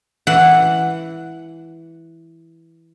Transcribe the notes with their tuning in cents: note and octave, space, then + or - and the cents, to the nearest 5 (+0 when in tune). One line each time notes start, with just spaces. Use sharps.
E3 +0 F#5 +0